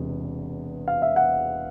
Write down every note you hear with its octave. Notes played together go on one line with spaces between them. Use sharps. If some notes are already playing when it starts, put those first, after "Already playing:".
Already playing: E1 E2 C3
F5
E5
F#5